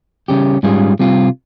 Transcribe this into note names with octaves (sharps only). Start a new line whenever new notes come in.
C#3 G3 C#4 G4
G#2 G3 C#4 F4 G#4
C3 G3 C4 F4